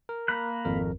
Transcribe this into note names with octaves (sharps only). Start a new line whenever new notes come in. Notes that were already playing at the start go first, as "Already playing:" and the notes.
A#4
A#3 B5 F#6
G#1 F2 A#4